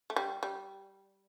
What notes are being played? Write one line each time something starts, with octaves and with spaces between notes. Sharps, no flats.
A3
G3
G3